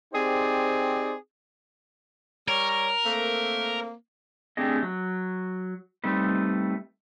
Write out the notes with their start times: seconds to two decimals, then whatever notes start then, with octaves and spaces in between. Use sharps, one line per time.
0.13 C4 D#4 G4 G#4 C5 D5
2.48 G3 A#4 C#5
3.05 A3 A#3 C4
4.57 A3 C4 D4 G4 G#4 D#5
4.83 F#3
6.04 G3 A3 C4 D#4 B4